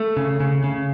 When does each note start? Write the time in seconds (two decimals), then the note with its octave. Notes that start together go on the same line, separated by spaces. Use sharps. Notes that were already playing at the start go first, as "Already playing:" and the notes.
Already playing: A3
0.17 C#3
0.40 C#3
0.64 C#3